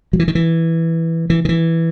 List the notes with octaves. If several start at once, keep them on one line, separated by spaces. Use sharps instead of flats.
F#3
E3
D#3
E3
E3
D#3
E3